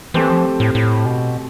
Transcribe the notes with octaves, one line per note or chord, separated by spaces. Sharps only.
E3 A3 C4 G4 C5
F3
A2
A2
B2